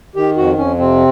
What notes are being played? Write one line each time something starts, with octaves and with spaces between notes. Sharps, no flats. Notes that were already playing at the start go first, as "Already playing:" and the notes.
D#3 G4
F2 F#4
F2 C#4
C3 C4